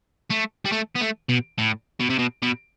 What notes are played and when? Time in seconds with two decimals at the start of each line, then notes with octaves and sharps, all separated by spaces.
0.30 A3
0.65 G3
0.72 A3
0.96 B3
1.01 A3
1.29 B2
1.58 A2
2.00 B2
2.10 C3
2.19 B2
2.42 B2